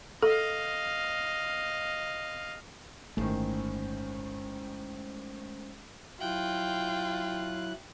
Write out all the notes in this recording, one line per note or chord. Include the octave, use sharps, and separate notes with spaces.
A4 D#5 F5
G1 A2 D#3 G#3 A3 C#4 C5
F#3 E4 F4 G5 F#6